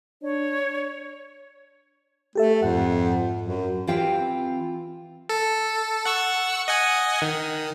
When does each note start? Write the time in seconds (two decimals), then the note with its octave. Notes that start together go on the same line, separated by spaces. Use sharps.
0.22 D4 C#5
2.35 A3 G4 A4 E5
2.62 F2 G#2 F#5
3.42 F#2
3.87 E3 C4 F4 G4 F5 G5
5.29 A4
6.05 F#5 C#6 E6
6.68 D#5 F#5 G#5
7.22 D#3